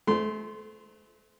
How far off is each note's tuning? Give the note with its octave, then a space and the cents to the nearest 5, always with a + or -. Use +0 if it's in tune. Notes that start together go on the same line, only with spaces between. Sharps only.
A3 -35 C5 -35 C6 -15